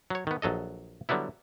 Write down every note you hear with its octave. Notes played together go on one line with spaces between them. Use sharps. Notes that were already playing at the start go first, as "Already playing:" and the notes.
F#3 C#5
D#3 B3
A#1 F#3 A4 D#5
D3 F#3 G3 B3 E4